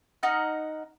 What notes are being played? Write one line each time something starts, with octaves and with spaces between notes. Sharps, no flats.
D#4 D#5 F#5 F6